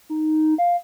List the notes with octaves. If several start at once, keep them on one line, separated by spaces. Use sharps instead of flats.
D#4
F5